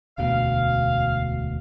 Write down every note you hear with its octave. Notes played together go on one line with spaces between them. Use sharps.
E1 D2 B2 F5